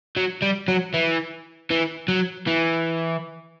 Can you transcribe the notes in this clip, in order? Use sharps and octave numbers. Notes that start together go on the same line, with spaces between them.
F#3
G3
F#3
E3
E3
F#3
E3